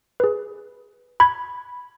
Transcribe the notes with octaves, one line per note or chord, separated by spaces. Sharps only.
G#4 B4
B5 G#6